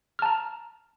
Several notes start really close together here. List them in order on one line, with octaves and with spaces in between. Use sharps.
F6 A5 A#5